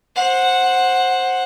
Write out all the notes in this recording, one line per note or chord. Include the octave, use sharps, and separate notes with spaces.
C5 F#5